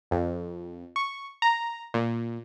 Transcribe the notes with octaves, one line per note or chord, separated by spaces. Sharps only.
F2
C#6
A#5
A#2